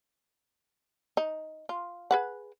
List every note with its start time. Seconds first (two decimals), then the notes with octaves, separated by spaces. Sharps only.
1.17 D#4
1.69 F4
2.11 G#4 B4 F#5